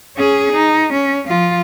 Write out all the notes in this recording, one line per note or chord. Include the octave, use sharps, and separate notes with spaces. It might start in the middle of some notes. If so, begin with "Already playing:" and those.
C#4 G#4
D#4
C#4
F3 F4